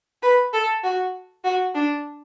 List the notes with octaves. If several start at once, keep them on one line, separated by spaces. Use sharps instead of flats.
B4
A4
F#4
F#4
D4